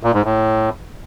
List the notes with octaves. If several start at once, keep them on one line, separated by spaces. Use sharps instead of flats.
A#2
G#2
A2